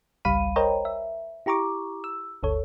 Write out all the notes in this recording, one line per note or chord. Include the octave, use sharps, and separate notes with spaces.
G#1 C#2 G3 F5 B5 D#7
A#4 C5 C#5 D#5 G5 A#5
E5
E4 G4 A#5 C#6 D6
E6
G1 D2 A4 C#5